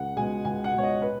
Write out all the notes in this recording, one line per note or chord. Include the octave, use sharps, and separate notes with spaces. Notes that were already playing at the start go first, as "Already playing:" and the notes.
Already playing: C#2 F#5
B2 G#3 G#5
C#2 G#5
F#5
B2 G#3 C#5
D#5
B4